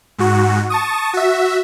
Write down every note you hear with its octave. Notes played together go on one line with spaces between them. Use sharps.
G#2 F#4
A5 C#6 D#6
F#4 E5